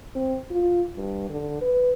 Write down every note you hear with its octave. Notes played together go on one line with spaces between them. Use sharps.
C4
F4
G2
D3
B4